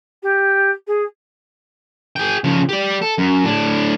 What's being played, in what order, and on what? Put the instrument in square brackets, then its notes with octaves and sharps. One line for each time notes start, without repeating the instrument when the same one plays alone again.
[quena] G4
G#4
[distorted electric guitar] G#4 G5
C#3 F3
G4 D5
A4
F#2
A2 D4